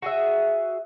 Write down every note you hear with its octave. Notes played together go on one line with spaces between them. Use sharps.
F#4 G#4 E5